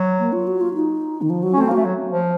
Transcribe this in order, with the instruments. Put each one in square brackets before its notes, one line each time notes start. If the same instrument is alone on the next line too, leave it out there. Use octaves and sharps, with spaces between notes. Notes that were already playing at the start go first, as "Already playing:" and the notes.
Already playing: [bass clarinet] F#3
[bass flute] A#3
F4
F#4
F4
D#4
D#3
F3
F#3
[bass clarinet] C#4
[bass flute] A3 [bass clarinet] C4
[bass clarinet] A#3
[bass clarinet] A3 [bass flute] F#4
[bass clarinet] F#3
F3